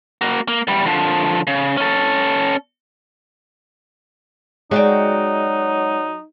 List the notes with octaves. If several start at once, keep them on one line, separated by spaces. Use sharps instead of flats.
A#3 F#4
A#3
E2 G3
D3 F3
C#3
C#4 A4
F#3 G#3 D#4 F#4 D5 G5